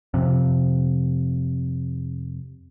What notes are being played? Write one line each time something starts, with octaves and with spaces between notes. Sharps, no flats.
F2 C3